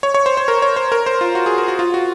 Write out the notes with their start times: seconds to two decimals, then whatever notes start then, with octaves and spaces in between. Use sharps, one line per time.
0.03 C#5
0.14 C#5
0.26 C5
0.37 C5
0.48 A#4
0.62 C#5
0.76 C5
0.92 A#4
1.06 C5
1.21 F4
1.35 F#4
1.46 G#4
1.58 A#4
1.68 F#4
1.79 F4
1.94 F#4